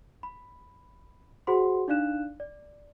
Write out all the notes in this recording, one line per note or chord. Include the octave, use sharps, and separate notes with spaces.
B5
F#4 G#4 C5 F#5 B5 C6
D4 D#4 D5 F5 F#6 E7
D5